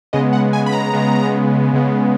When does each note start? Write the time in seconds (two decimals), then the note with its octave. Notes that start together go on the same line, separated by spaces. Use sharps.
0.13 C#3 G#3 B3 D#5
0.33 F#5
0.53 G#5
0.66 B5
0.72 A#5
0.93 C#3 G#3 B3
1.73 C#3 G#3 B3